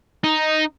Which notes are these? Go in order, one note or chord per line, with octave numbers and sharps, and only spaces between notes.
D#4